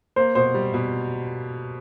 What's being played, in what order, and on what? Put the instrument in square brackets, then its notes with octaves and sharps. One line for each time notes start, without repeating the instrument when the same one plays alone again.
[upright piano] A#3 [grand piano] C5
[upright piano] B2 [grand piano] C5
[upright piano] G3
B2